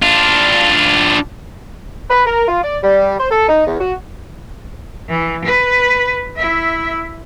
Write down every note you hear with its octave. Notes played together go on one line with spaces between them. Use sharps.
D4 F4
B4
A#4
F4
D5
G3
C5
A4
D#4
E2
F#4
E3
B4
E4 E5